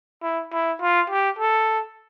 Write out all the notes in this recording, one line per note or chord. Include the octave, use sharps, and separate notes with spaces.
E4
E4
F4
G4
A4